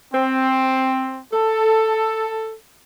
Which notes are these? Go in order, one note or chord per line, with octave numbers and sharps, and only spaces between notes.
C4
A4